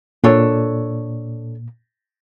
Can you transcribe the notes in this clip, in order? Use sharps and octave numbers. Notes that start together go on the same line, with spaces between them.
A#2 D4 A4 C#5